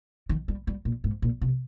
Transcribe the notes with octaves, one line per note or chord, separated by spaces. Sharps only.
D#3
G3
G3
A#2
G#2
A#2
C3